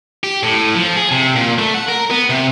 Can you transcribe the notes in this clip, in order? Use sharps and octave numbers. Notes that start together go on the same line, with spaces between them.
G4
A2
F3
G#4
C3
A#2
A3
F#5
A#4
B3
C3